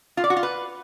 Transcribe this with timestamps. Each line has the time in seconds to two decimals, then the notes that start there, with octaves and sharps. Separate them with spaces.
0.17 F4
0.24 D5
0.30 F#4
0.36 F4
0.43 B4